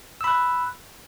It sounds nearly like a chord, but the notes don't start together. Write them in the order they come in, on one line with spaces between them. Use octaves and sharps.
E6 B5 F#6